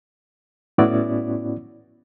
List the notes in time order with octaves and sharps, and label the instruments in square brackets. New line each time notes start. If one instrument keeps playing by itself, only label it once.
[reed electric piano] A2 B3 C#4 E4 F#4 D5